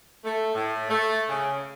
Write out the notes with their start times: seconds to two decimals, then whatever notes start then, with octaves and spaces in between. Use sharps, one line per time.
0.24 A3
0.55 A2
0.90 A3
1.29 C#3